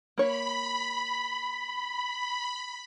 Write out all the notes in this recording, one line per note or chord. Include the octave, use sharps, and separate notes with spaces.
A#3 C#5 B5